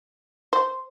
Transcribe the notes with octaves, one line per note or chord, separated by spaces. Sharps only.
C5